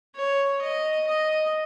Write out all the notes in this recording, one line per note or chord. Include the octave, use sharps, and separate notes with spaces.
C#5
D#5
D#5